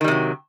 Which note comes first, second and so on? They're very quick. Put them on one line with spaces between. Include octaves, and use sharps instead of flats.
D#3 G3 C3 F#3